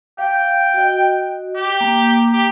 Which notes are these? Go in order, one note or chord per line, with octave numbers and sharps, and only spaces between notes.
F5 G5
F#4 D#5
G4
A#3
G4